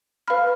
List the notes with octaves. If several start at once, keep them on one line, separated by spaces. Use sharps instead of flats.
B4 F5 B5 F6